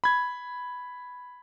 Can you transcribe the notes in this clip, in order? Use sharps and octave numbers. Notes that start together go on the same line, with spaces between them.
B5 G#6